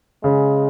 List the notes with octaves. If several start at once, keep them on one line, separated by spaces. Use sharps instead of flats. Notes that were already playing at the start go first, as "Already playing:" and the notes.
C#3 G#3